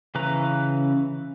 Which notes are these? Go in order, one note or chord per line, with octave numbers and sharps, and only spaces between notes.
C#3 E3 C#4 B4 A#5